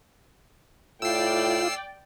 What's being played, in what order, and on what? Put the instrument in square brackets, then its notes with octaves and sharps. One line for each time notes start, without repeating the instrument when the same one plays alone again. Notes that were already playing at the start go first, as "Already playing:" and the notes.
[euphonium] A2 [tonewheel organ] F4 [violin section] D5 G5 [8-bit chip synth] E6 C7